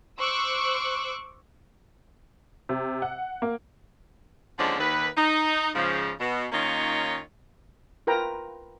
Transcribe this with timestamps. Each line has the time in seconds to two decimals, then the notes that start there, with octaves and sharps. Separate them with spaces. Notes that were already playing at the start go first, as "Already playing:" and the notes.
0.18 C5 C#6 D6 E6 F#6
2.69 C3
3.02 F#5
3.42 A#3
4.58 D#2 D3 F3 G#3 C#4 D4
4.79 D#2 B4
5.17 D#4
5.75 G#2 C#3 F3
6.20 B2
6.52 D#3 A#3 C#4 D#4 F4 C#5
8.07 F4 A#4 B4 G5 A#5